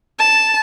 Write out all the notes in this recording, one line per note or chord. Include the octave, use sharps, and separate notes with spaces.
A5